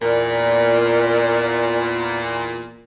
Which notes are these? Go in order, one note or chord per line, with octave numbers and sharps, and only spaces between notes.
E2 A#2 A#4 D5